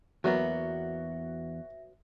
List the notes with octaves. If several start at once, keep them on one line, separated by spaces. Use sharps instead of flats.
E2 F#3 A#3 B3 F#4 E5 A#6